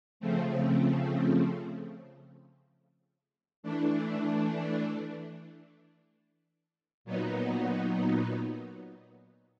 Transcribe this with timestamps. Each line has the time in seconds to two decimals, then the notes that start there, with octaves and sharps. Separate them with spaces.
0.20 C#3 F3 A3 C4
3.63 E3 A3 D4
7.05 A#2 F#3 B3 D#4